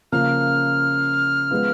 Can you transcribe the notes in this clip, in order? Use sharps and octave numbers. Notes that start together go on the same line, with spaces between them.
C#3 F3 A#3 F6
F3 G#3 B3 F4